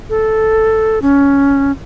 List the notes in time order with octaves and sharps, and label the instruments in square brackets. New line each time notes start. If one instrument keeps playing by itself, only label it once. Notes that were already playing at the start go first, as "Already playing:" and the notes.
[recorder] A4
C#4